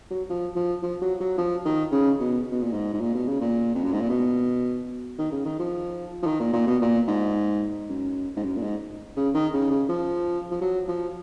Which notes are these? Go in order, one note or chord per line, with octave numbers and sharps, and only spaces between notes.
F#3
F3
F3
F3
F#3
F#3
F3
D#3
C#3
B2
B2
A#2
G#2
G#2
A#2
B2
C#3
A#2
F2
F#2
G#2
A#2
B2
D#3
C#3
D#3
F3
F3
D#3
A#2
A#2
B2
A#2
G#2
F#2
G#2
F#2
A#2
G#2
C#3
D#3
C#3
C#3
F3
F3
F#3
F3